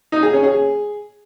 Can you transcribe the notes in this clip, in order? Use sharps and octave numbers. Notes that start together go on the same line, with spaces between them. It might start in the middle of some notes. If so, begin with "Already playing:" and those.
D#4
G#4
C#4
G#4